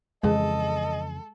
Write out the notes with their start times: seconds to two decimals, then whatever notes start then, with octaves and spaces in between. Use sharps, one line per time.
0.23 F2 C#3 E3 G#3 A4 D#5